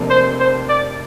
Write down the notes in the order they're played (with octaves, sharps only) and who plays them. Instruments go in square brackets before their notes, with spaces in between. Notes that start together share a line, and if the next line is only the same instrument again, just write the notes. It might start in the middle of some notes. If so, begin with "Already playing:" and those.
Already playing: [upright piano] F1 F2 C3 A#3 D4
[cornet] C5
C5
D5